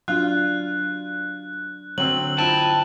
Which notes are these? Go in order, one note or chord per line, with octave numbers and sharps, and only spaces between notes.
F#3 D4 F4 F#6
D3 F#3 C4 E6 F#7
E4 F4 C5 G5 A5